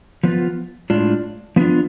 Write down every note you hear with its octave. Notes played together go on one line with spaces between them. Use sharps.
F3 B3 F4
A2 G#3 D4 F4
F3 B3 D4 F4